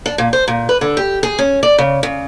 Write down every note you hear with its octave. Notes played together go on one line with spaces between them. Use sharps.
D4
A#2
C5
A#2
B4
D3
G4
G#4
C#4
D5
C#3
C#3